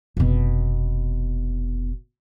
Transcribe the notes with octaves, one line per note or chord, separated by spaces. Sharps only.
F1 B2